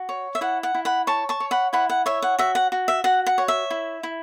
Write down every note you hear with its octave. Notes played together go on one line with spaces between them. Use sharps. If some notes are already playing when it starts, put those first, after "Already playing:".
Already playing: F#4
C#5
E5
E4 F#5
F#5
E4
F#5 B5
C#5 A5 C#6
A5 C#6
C#5
F#5 B5
E4 F#5 B5
F#5
C#5 E5
F#5
F#4 E5
F#5
F#4
E5
F#4 F#5
F#5
C#5
E5
E4
E4